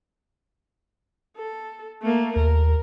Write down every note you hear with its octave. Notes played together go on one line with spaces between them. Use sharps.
A4
A3 A#3
D#2 A#4